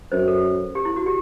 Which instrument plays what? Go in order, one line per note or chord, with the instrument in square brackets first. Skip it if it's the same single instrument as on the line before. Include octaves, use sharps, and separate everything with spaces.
[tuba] F#2 [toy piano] C5
[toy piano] A4
G4
E4
F#4
G4